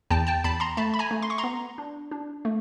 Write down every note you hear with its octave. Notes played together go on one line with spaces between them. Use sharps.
E2 G5 A5
G5 A5
E2 A5 B5
A#5 C6
A3 A5 B5
B5
G#5 A#5
A3
C6
C#6
A#5 C6
B3
D4
D4
A3